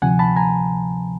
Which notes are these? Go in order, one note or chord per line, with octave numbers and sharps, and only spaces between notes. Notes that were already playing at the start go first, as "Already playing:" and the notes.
D2 C3 F3 F#5 G#5
A5 B5
G#5 A#5